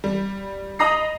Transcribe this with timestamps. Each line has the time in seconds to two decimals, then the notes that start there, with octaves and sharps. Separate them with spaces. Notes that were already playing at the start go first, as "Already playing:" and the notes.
0.04 G3
0.79 D#5 A#5 B5 D#6 A#6 C7